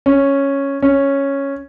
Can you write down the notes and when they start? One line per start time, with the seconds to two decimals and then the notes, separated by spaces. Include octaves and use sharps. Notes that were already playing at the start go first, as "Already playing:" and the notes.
0.06 C#4
0.82 C#4